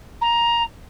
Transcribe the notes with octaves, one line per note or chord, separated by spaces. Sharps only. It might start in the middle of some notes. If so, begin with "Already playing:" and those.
A#5